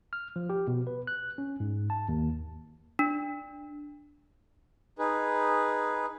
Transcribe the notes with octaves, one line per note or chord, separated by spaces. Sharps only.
F6
F3
G4
B2
B4
F#6
C#4
G#2
A5
D#2
D4
D#4 G#4 B4